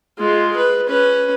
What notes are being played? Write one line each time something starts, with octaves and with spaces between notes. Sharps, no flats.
G#3 F4
B4
C#4 B4